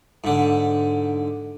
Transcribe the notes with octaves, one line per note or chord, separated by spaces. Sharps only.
G#2 D3